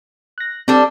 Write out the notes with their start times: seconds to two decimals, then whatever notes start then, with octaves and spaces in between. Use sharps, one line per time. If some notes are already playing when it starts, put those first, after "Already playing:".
0.38 F#6 A#6
0.68 G3 C4 D4 A4